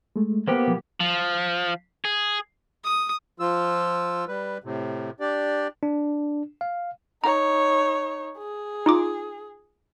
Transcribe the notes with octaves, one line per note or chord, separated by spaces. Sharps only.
G#3 A3
A#3 B3 G4 C5
B2 F3 F#3
F3
G#4
D#6
F3 F4 E6
G3 B4
A2 C3
D4 G4 D5
D4
F5
D#4 C#5 A#5
G#4
D#4 F4 D6